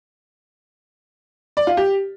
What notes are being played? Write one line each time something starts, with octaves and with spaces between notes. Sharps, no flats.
D5
F4
G4